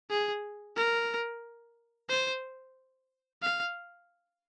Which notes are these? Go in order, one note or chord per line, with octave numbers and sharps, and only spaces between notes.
G#4
A#4
C5
F5